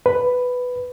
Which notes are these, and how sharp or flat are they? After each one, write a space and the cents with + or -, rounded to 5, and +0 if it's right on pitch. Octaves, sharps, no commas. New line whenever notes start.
B4 +5